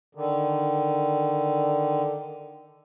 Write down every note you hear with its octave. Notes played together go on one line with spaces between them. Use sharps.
D3 D#3